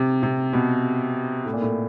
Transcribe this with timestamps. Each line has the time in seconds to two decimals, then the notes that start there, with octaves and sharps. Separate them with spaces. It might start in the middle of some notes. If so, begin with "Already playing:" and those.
Already playing: C3
0.23 C3
0.53 B2
1.45 A2
1.53 A#2
1.62 A2